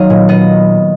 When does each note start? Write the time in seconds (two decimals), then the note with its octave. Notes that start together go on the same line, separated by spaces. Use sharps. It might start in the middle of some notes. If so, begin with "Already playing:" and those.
Already playing: D#3 F#3 D#5 F5
0.10 A#2
0.29 B3 D#5